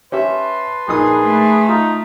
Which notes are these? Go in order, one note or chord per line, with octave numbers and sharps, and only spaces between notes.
C#4 G4 B4 E5 A5 C6
A#1 D#4 G#4 D#6
A3
D#4 F4